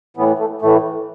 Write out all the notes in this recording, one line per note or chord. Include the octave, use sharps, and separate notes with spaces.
A2 E3 B3
A3
A2 E3 A3